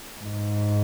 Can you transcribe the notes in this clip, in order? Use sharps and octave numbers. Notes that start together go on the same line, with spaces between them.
G#2